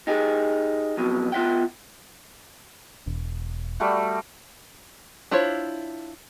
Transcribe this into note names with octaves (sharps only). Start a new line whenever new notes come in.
D#4 G4 G#4
F2 B2 F#3
B3 F4 E5 F#5 G5
E1
G3 A3 F#4
D4 E4 F4 C5 C#5